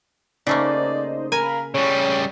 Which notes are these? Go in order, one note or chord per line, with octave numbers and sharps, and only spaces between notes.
C#3 A3 A#3 D#4 C5 D5 D#5
A#4 F5 G#5 B5
C#3 G3 C#5 D#7